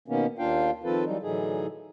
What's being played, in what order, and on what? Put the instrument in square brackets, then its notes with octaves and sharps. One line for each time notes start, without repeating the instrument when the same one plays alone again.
[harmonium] B2 D#3 A#3 B3 C#4
D#2 A#3 D4 F4 F5 G5
D#3 F3 C4 F4 A4 B4
E3 F#3 G3 D#4
A2 D3 E3 F#3 D#4 G#4